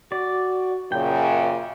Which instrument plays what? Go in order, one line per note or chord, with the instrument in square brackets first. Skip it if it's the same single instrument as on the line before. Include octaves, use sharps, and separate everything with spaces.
[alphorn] F#4 [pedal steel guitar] D5
[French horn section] F#2 C#3 [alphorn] A#2 [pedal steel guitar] G5